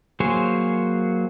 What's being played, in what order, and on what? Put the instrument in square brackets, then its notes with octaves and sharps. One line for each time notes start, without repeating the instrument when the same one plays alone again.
[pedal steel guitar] F#3 A#3 G#4 C5 C#5